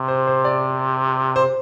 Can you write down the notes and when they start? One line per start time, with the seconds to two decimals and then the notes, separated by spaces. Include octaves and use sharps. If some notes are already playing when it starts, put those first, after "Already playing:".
Already playing: C3
0.08 C5
0.27 C5
0.45 D5
1.36 C5